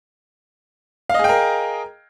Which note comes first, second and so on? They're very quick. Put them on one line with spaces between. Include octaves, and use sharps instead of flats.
F5 D#5 G#4 G5 A#4